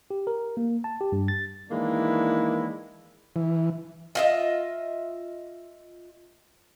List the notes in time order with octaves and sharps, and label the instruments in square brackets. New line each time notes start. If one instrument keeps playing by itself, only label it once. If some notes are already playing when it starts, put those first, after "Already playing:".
[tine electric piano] G4
A#4
A#3
A5
G4
G2
A6
[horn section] D#3 E3 G#3 A#3 D4 E4
[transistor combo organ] E3
[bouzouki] F4 D#5 E5